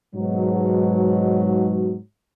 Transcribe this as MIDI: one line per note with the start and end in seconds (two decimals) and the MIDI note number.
0.15 1.97 44
0.15 1.97 47
0.15 1.97 54